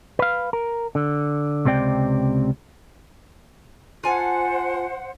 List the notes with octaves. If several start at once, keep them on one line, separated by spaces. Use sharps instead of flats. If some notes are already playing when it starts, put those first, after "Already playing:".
B4 F5
A#4
D3
C#2 C3 C4 D5 G5
F4 C5 F#5 G#5 A5